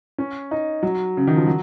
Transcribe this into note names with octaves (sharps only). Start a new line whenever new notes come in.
C#4
D#4
F#3
C#3
D#3
F3
F#3